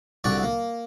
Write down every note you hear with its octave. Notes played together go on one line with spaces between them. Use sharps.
C2 D3 F#4 D5
A#3